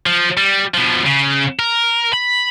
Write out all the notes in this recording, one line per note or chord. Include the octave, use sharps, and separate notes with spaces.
F3
G3
B2 F3
C#3
A#4
B5